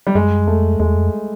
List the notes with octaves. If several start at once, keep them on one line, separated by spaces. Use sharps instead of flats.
G3
F#2 G#3
F2 A3
E2 G#3
F2